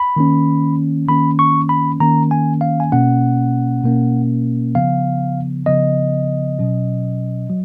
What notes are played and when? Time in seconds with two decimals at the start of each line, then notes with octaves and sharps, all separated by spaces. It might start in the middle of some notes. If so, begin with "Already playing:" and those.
Already playing: B5
0.16 D#3 A#3 C#4
1.08 D#3 A#3 C#4 B5
1.39 C#6
1.69 B5
2.00 D#3 A#3 C#4 A#5
2.31 G#5
2.61 F5
2.80 G#5
2.92 B2 A#3 C#4 F#5
3.84 B2 A#3 C#4
4.75 C#3 F3 B3 F5
5.66 C#3 F3 B3 D#5
6.59 B2 F#3 C#4
7.50 F#3